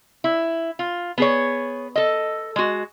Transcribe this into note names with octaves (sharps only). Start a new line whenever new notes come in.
E4
F4
B3 G#4 C#5
A4 D#5
G#3 F#4